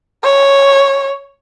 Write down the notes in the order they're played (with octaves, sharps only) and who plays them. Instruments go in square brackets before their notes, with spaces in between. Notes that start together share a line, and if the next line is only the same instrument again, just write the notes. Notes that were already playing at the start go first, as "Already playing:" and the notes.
[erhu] C#5